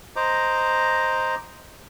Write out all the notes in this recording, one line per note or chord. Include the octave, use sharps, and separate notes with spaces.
C5 D#5 A#5 D6